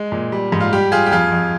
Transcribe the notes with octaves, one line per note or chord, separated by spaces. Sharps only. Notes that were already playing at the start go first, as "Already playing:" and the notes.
Already playing: G#3
A#2
G3
G#2
F4
G3 G4
G3 F4 G#4
G4
F2 F4 G#4
F2